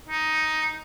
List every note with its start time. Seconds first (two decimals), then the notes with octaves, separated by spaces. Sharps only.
0.08 D#4